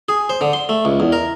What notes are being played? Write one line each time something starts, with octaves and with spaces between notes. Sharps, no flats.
G#4
C5
D3
C6
A3
C#2
E2
A#4